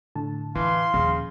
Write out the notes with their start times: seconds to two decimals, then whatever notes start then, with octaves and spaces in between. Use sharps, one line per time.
0.15 A2 D3 A5
0.55 E3 E4 F5 C6
0.94 D#2 A#2 C#3 F3